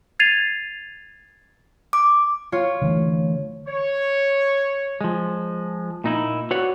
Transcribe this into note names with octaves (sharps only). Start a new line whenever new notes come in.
G#6 A6 C7 D#7 F7
D6
F4 C#5
D3 E3 A3
C#5
F3 G#3
A#2 D#4 E4
F#4 B4 C#5 D5 F#5